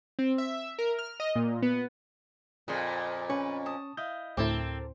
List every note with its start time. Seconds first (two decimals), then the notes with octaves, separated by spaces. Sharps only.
0.19 C4
0.38 E5
0.79 A#4
0.99 F6
1.20 D#5
1.35 A#2
1.62 B3
2.68 F2 A#2 G#4 C5 D#5
3.30 C#4 B4 C#6
3.66 A5 D#6
3.97 E4 D#5 F5 G6
4.37 D2 A2 C4 E4 A4 A#4 D6